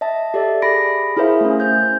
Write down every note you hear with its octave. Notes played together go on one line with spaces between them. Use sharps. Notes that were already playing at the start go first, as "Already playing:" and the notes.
D#5 E5 A5
G4 A4 D5 E5
G4 G#4 B5 A#6 D7
E4 G#4 A#4 C5 E5 F5
A3 C#4
C5 G6